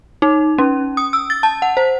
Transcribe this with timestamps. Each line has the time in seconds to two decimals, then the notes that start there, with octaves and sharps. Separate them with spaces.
0.22 D#4
0.58 C#4
0.97 D#6
1.13 E6
1.30 A6
1.43 A5
1.62 F#5
1.77 C5